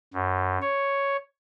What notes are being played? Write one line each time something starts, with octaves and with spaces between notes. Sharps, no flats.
F#2
C#5